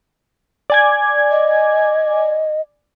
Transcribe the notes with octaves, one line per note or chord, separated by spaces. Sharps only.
D5 G#5 G#6
D#5